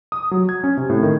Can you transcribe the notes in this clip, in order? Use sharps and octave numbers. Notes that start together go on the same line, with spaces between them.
D#6
F#3
G#6
C#4
C3
A2
D#3